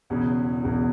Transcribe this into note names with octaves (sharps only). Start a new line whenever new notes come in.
E1 E2 C#3
E1 E2 C#3